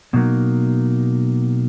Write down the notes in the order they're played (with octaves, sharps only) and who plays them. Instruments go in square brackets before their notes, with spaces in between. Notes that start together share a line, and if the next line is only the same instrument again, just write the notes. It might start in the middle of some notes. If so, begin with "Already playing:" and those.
[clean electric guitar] B2 F#3 A#3 D#4